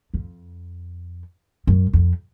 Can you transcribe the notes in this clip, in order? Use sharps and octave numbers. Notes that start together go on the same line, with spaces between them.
F2
F#2
F2